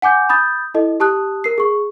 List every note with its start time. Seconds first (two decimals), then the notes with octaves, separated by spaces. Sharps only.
0.02 F#5 G#5 D6 G6
0.29 B5 D#6 G6 A6
0.74 E4 A4 D#5
1.00 G4 A5 D#6 F#6
1.44 A#4 C7
1.58 G#4 C#6